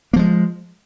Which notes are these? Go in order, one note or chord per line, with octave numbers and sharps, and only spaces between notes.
F3 G#3 A#3